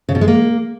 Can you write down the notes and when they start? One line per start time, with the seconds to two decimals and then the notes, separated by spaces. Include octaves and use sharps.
0.09 C#3
0.15 B2
0.21 G#3
0.28 A#3